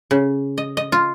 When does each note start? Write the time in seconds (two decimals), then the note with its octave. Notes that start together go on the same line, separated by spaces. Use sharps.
0.11 C#3
0.58 D#5
0.77 D#5
0.92 F4